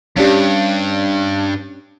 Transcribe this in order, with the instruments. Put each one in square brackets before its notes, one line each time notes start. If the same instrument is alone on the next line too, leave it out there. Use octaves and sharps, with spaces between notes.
[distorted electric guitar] G2 [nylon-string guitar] C#4 D4 G4